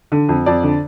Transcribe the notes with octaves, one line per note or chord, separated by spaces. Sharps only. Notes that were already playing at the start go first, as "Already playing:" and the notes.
D3
F2
F2 D5
D3